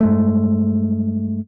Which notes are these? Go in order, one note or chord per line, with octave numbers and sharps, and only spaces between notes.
G2 G#3 A3